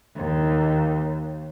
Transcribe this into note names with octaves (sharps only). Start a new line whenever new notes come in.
D#2